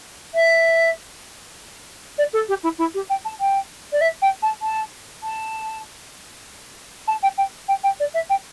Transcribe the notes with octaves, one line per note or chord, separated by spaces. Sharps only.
E5
D5
A4
G4
E4
E4
G4
G5
A5
G5
D5
E5
G5
A5
A5
A5
A5
G5
G5
G5
G5
D5
E5
G5